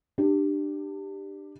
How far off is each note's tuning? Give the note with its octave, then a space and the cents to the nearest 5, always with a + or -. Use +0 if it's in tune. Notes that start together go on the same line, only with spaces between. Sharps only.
D4 +25 G4 +0